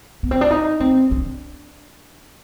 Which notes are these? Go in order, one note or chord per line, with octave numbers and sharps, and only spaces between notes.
B3
C4
D4
D#4
C4
D4